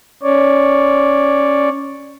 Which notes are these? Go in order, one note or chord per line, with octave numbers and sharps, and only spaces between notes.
C#4 C#5 D5